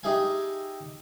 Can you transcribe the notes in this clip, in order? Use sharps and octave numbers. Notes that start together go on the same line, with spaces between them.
D#4 G4 G#4 E5 F5 G#5